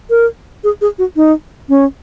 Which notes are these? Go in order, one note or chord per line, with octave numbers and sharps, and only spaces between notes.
A#4
G#4
G#4
F#4
D#4
C#4